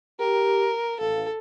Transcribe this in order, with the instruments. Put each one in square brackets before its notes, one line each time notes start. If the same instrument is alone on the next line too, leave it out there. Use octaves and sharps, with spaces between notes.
[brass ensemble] G4 [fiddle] A#4
[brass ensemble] A1 F5 [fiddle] A4